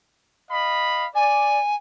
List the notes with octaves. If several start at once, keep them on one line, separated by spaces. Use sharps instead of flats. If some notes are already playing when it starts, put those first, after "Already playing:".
D#5 F5 B5
D5 G#5